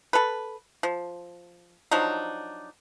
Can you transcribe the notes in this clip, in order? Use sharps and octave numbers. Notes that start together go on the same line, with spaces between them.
A4 B4
F3
F3 F#3 D4 D#4